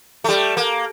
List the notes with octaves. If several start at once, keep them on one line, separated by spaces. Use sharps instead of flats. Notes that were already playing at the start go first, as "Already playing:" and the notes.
G3 A3
A#3